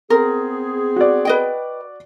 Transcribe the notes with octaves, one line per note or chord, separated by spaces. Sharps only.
B3 C4 G#4 A#4
F#4 D5
B4 D#5 G5